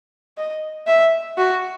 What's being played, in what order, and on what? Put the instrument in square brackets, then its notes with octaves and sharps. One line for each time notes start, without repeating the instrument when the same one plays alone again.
[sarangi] D#5
E5
F#4